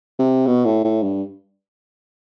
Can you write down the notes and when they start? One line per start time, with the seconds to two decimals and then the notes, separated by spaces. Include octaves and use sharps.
0.19 C3
0.47 B2
0.66 A2
0.84 A2
1.03 G2